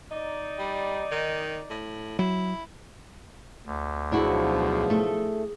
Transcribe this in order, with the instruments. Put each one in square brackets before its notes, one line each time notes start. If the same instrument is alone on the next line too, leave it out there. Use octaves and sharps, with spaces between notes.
[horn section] D#4 D5
[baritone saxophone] G3
D#3
A2
[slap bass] F#3 [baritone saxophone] E4
[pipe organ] D2
[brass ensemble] B1 F3 [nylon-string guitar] D4 E4 F#4 [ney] G#4
[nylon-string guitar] A3 A4